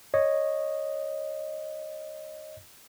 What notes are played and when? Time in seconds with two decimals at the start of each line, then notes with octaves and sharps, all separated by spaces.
0.14 C#5 D#5